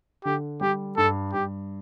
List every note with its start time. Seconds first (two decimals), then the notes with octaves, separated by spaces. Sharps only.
0.24 D3 G4
0.61 G3 G4
0.97 G2 A4
1.33 G2 G4